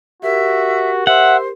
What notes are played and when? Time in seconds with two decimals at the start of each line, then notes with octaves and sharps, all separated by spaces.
0.22 F#4 G4 A#4 E5
1.07 C5 E5 F#5